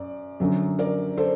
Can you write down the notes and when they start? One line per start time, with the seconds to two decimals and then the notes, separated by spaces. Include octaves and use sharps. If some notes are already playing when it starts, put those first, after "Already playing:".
Already playing: F#2 D5
0.40 F#2 D3 F#3
0.79 A#4 D5
1.17 A4 C5